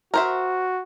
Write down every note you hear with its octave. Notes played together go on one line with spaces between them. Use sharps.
F#4 A#4 C5 E5